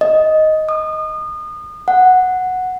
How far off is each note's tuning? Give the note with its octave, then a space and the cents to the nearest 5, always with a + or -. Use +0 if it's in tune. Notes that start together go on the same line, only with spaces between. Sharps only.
D#5 +5
D#6 -30
F#5 -5